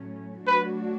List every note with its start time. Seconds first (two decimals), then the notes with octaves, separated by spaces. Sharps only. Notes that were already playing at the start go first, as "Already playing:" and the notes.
Already playing: A2 F#3 A3 C#4
0.47 F#3 A3 D4 F#4 B4